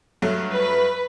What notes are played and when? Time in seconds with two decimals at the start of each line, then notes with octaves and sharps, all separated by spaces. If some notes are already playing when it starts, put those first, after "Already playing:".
0.22 G2 F#3 A3
0.52 B4